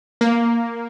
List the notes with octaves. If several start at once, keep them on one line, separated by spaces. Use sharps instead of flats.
A#3